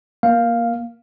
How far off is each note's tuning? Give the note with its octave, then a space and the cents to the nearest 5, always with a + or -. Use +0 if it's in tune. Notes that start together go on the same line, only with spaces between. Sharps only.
A#3 +15 F5 +0